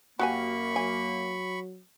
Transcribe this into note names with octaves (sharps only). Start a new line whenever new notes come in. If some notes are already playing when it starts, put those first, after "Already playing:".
F#2 A#3 F#4 G4 G#5 B5 C#6
F#3 G#5